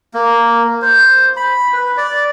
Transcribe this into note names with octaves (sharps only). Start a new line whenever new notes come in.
A#3
C5
B5
B4
D5